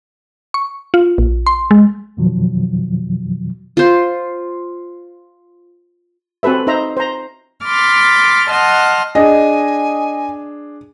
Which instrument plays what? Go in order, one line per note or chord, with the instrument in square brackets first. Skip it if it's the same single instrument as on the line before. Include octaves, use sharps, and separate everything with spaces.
[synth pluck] C#6
F4
A#1
C6
G#3
[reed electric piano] F2 B2 D#3 F3 F#3
[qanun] F4 C5
[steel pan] C4 F#4 A4 B4 E5
D#4 C5 E5 A#5
C5 A#5
[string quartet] B5 C6 D6 F6 A6
D#5 F#5 A5 C6 F6
[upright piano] D4 G#4 [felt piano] D#5 [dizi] G#5